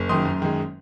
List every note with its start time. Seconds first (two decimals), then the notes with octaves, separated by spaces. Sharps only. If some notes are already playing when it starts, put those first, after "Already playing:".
Already playing: F#1
0.09 F#2 D#3 C6 D#6
0.25 F#2
0.42 D#3 G#3